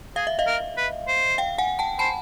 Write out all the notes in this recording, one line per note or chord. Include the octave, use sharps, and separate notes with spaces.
G#4 F5
E5
D#5 F5
A#4
B4
C5
F5 G5
F#5 G#5
G5 A5
C5 A5 B5